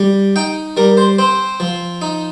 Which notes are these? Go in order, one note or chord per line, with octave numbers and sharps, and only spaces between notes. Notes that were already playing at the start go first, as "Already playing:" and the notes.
Already playing: G3
D#4 G5
G3 A#4
C5
C4 C5
F3
D#4